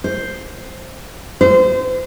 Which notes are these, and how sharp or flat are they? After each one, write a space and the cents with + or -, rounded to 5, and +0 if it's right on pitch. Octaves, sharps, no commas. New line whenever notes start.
C5 +0
C5 -25